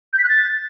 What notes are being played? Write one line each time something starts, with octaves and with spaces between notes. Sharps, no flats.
G6
B6
F#6
A6